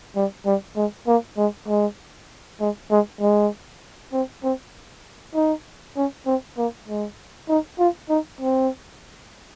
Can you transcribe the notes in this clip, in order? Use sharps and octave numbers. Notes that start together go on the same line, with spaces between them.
G3
G3
G#3
A#3
G#3
G#3
G#3
G#3
G#3
C4
C4
D#4
C#4
C4
A#3
G#3
D#4
F4
D#4
C4